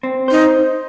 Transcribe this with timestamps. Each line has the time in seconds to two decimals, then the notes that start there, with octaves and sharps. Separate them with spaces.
0.03 C4
0.28 D#4 C5